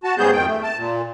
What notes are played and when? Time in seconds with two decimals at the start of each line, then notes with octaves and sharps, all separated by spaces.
0.04 F#4 A5
0.18 G#2 C#3 G3 B3 G#4 G6
0.33 F2 D#3 G5
0.47 A3
0.63 A5
0.77 A#2